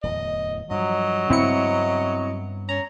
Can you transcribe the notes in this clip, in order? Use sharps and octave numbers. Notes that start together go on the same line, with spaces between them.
D1 E2 D#5
G2 F3 F#3 D#5
G2 C#3 B3 C4 E4 C#7
C#4 A#5